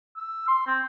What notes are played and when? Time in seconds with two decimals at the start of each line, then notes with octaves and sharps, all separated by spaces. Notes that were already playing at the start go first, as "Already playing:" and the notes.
0.17 E6
0.48 C6
0.67 C4